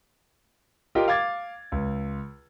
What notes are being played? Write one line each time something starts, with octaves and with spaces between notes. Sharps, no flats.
F4 G4 A#4 D#5 G5
F5 D6 G#6 A6
C#2